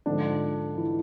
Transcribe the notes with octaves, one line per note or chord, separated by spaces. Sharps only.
G#2 D3 F3 D4
E3 E4